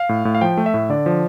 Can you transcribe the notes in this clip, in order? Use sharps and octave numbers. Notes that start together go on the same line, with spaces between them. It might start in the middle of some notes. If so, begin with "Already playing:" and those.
Already playing: F5
A2
A2
F5
F3 G5
A3
E5
A2
D3 D5
F3